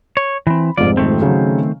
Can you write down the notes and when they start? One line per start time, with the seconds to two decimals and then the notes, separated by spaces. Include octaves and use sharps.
0.17 C#5
0.47 E3 C4 B5
0.77 F1 F2 G#2 F4 D5
0.97 D#3 A3 C4
1.22 C#3 F#3